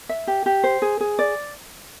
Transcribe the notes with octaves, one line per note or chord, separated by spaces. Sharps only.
E5
G4
G4
C5
G#4
G#4
D5